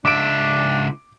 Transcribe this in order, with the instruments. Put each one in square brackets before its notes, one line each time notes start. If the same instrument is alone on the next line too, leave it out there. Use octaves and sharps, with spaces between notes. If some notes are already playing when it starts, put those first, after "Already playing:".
[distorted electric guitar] C#2 E5 [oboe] D4 [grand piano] D6 D7